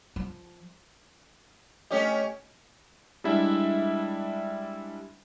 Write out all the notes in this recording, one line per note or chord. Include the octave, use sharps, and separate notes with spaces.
F3
A3 C#4 G4 C#5 D#5
G3 G#3 D4 E4 E5